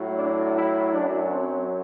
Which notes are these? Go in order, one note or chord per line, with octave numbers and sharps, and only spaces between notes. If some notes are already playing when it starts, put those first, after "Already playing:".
Already playing: A2 F#3
D4
E4
F#2 F#3 D4
C4